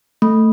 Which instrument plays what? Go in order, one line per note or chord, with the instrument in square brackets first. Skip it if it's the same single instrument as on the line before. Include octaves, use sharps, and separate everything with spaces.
[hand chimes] A3